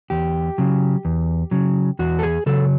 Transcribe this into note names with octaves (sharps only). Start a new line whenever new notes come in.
E2 G4
C#3 F#3
E2
C#3 F#3
E2 F#4
A4
G#4
C#3 F#3 A4